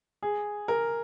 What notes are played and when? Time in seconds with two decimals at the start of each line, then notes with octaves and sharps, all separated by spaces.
0.23 G#4
0.68 A#4